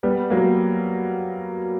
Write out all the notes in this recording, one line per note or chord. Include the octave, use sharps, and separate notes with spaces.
G3 B3
F#3 A#3